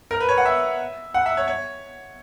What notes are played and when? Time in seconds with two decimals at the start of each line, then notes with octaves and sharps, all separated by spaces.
0.11 A#4
0.20 B4
0.29 C#5
0.38 F#5
0.45 E5
1.14 F#5
1.26 E5
1.37 C#5
1.48 C#5